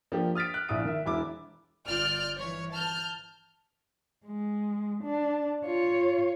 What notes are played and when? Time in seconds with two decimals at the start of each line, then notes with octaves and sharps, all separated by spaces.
0.12 F3 A#3 D4 G4
0.35 D#6 F6 A6 B6 D7
0.54 F#6
0.69 A#1 E4 D#6 D7
0.85 D#3 E5
1.06 E1 E4 D6
1.87 G1 F4 D5 F6 G6
2.37 E3 C#5
2.74 A5 F6 G6
4.26 G#3
5.04 D4
5.66 F4 C#5